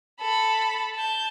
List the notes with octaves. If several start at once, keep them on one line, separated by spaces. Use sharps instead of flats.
A4 B5
A5 G6